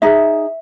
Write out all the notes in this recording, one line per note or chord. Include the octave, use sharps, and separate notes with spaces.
D#4 G#4 E5